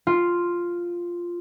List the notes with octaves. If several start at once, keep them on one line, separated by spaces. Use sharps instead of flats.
F4